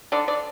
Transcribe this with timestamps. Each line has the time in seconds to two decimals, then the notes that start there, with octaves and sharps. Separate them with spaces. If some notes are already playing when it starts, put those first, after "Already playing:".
0.12 D3 D5
0.28 D5